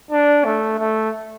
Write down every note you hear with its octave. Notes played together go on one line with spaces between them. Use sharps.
D4
A3
A3